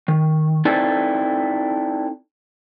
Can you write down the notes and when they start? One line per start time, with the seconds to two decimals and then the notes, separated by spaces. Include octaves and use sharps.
0.08 D#3
0.65 C4 D#4 E4 A4 B4 D5